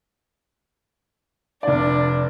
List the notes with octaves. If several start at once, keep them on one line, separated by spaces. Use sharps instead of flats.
F1 D4 D5